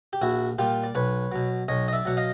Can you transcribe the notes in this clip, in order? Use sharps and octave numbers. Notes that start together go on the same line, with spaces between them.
G4
A#1 E4 F#4
A#2 G3 F4 G4
D5
B1 B4 C#5
B2 F#3
B1 C#5 D#5
D#5
D5 E5
B2 F#3 F#5
D#5 F5